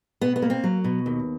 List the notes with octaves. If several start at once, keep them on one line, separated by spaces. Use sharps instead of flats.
B2 B3
B3
A#3
C4
F#3
B2
D#2